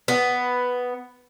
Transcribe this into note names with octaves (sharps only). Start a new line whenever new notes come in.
B3